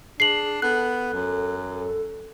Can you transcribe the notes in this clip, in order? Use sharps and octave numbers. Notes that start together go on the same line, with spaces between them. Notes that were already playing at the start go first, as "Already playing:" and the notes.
D4 G#4 C7 F#7
B3 A4 F#6
F#2